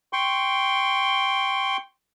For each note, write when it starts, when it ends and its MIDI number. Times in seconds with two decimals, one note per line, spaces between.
0.13 1.77 79
0.13 1.77 84
0.13 1.77 85